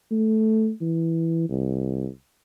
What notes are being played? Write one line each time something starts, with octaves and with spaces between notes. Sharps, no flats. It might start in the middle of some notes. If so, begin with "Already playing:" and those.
A3
E3
C2